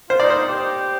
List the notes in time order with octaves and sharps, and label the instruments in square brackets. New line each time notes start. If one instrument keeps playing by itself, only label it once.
[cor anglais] F4 [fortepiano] C5
[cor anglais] D#4 [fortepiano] D5
[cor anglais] D#4 [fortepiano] C5
[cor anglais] G4